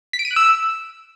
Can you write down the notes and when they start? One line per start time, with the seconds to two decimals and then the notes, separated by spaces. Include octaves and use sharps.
0.13 B6
0.19 D7
0.25 D#7
0.31 F#6
0.36 E6